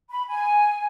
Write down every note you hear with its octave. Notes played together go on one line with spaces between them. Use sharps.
B5
G#5